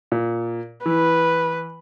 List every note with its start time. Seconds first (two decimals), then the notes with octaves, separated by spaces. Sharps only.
0.12 A#2
0.86 E3 B4